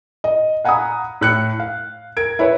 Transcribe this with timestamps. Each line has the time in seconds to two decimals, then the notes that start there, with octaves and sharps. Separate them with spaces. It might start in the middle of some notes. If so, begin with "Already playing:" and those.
0.24 D#5
0.65 F5 F#5 G#5 A#5 B5 D#6
1.21 A2 F#6 C#7
1.60 F5
2.17 A#4 G#6 D7
2.39 E4 B4 C#5